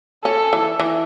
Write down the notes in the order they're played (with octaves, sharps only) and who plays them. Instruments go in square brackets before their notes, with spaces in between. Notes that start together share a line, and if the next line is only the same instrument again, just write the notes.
[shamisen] C#4 [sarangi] A4
[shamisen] E3
E3